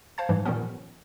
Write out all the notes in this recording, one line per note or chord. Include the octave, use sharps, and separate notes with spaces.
C5 F5 A5 G#6
G#2 E3 G3
A#2 D#3 F3 G3 B3 C#4